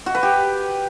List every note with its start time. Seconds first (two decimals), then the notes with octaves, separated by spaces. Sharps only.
0.06 F#4
0.15 B4
0.23 G4